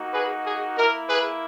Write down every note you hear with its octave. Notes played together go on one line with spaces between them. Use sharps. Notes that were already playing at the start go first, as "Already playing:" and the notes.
Already playing: A#3 D#4 F#4
G#4 B4
G#4
A#3 E4 A#4
G#4 B4